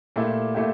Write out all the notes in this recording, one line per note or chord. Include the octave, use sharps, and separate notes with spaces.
A#2 A3 E4 G4
A#2 A3 E4 G4